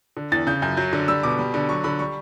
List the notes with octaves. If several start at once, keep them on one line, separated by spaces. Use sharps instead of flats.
D3
E2 A6
C#3 G6
F#2 G6
F#3 G6
D3
G3 E6
B2 D6
G3
D3
F#3 C#6
D3 B5
G3 C#6